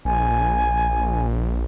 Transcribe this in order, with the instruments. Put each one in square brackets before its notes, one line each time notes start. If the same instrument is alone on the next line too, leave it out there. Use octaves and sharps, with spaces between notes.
[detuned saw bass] A#1 [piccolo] G#5